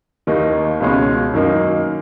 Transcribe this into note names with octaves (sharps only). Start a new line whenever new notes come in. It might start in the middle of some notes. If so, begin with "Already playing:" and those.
D#2 D#3 A#3 D#4
C#2 B2 G#3 C#4
F#2 D#3 A#3 D#4